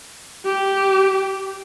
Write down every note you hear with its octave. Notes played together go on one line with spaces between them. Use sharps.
G4